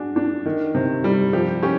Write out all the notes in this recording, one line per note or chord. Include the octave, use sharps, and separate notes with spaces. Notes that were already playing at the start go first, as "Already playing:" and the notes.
Already playing: D4 F#4 G#4
D4
D#3
C3
G3
F3 G4
C#4 G4